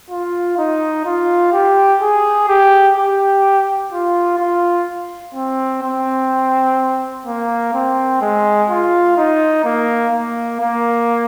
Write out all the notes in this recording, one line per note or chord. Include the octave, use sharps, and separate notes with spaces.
F4
D#4
F4
G4
G#4
G4
G4
F4
F4
C4
C4
A#3
C4
G#3
F4
D#4
A#3
A#3
A#3